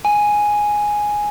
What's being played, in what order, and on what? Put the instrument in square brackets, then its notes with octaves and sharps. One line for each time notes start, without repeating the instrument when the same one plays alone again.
[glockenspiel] G#5